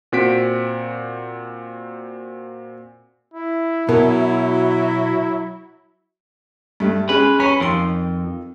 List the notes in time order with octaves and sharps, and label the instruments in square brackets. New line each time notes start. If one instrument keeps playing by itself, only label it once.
[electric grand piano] A#2 C4 F#4 B6 D7
[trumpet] E4
[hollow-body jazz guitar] B2 [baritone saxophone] F#3 [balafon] A#4
[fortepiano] G2 A3
[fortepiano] G#3 C#4 G#4 [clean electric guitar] B4
[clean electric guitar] C#4 [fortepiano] B5
[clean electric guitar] F2 [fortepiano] D#3 C6